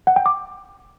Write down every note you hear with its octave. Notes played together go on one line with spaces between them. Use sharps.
F#5
G5
D6